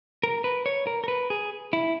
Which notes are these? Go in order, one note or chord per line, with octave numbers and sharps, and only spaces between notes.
A#4
B4
C#5
A#4
A#4
B4
G#4
E4